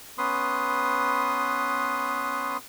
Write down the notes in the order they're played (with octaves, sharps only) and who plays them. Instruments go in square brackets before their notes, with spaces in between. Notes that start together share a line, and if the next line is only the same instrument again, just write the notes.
[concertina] B3 C#4 B4 C6 D#6